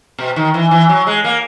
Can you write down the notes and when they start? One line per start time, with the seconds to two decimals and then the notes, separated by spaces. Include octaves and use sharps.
0.18 B2
0.36 D#3
0.54 E3
0.71 E3
0.89 F#3
1.07 G#3
1.24 A#3